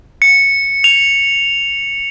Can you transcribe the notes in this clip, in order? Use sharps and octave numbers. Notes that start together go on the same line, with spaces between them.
C#7
F7